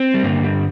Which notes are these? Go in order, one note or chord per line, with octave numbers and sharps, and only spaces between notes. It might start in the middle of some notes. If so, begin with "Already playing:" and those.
Already playing: C4
G3
G2 D3 A#3
G3